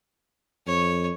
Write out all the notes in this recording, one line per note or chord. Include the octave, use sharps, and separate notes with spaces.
F2 C#5